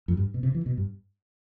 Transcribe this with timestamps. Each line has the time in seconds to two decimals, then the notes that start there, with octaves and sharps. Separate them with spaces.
0.08 F2
0.17 G2
0.34 B2
0.43 C3
0.55 E3
0.66 B2
0.77 G2